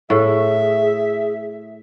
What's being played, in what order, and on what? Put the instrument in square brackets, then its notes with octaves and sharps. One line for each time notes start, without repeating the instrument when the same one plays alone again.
[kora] A2 [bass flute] G#4 [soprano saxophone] E5